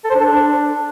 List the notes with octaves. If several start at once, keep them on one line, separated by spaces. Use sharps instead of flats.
A4
C5
D4
A4
D4